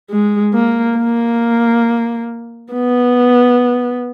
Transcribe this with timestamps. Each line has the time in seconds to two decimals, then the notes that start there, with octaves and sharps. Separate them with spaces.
0.10 G#3
0.54 A#3
0.98 A#3
2.72 B3